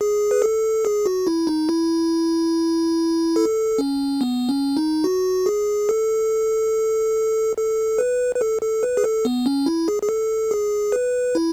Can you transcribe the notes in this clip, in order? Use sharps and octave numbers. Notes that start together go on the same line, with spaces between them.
G#4
B4
A4
G#4
F#4
E4
D#4
E4
A4
C#4
B3
C#4
D#4
F#4
G#4
A4
A4
B4
B4
A4
A4
B4
G#4
A4
B3
C#4
E4
G#4
G#4
A4
G#4
B4
E4